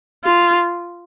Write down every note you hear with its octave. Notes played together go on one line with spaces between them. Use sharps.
F4